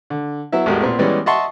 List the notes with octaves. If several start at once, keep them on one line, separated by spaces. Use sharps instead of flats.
D3
F#3 B3 E4 E5
A1 E2 G#3 F#4 G4 A#4
A#2 B3 C4
E3 G3 G#3 B3 C#4 D5
D#5 E5 F#5 A5 C6 C#6